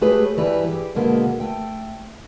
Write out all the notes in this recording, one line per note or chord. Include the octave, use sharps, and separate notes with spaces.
G#3 A3 G4 G#4 B4 C#5
G2 E3 G3 B4
G4 G#4
B2 D3 G#3 A#3 B3
A3 G5